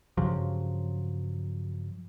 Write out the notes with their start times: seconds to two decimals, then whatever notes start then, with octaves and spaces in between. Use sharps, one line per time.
0.17 G2 C#3 F3 F#3